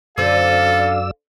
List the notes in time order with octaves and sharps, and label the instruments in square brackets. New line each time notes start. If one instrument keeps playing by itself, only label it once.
[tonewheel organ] F#2 D5 E6 [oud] D3 C4 [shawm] A4 [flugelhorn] F5